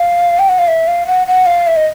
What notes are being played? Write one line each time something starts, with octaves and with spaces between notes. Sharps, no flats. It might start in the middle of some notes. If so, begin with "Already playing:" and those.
Already playing: F5
G5
F#5
F5
E5
F5
F#5
F#5
F5
E5
D#5